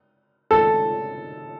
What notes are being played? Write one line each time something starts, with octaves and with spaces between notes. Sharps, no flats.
A4